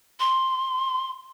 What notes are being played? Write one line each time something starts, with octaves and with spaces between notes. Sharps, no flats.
C6